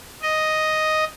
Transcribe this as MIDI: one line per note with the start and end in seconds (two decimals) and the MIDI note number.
0.22 1.04 75